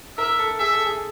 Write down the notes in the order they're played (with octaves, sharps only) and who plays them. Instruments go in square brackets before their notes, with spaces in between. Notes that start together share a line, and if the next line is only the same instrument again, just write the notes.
[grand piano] A#4 [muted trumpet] E5
[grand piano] A4
[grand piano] G#4 [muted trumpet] E5
[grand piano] A4
G#4